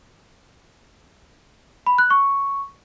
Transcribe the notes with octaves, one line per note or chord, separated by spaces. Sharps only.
B5
F#6
C#6